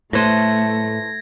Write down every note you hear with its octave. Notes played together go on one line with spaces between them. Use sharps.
A2 A3 A4 B4 C5 G#6 A#6